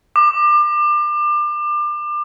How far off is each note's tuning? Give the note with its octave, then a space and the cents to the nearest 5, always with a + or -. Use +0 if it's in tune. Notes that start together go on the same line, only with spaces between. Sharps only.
D6 +30